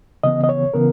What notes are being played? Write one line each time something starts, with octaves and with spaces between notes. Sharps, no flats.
C#3 E3 B3 D#5
D#5
C#5
C#3 E3 B3 A#4